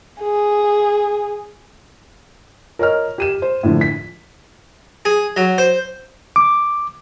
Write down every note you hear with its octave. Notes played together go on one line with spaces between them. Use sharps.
G#4
A#4 C#5 D#5 F6
G4 D#7 E7
C5
A2 D3 F3
B6
G#4
F#3
C5
D6